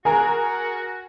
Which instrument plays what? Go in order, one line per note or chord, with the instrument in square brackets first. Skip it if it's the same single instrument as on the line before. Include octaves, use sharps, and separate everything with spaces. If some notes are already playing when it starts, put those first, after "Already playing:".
[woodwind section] F#4 [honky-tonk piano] G#4 A#4 A#5 [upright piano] G#5